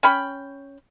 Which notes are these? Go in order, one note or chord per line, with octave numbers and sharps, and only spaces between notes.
C#4 G5 B5